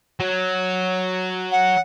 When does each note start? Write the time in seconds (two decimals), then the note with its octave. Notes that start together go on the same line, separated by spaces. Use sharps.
0.20 F#3
1.52 F#5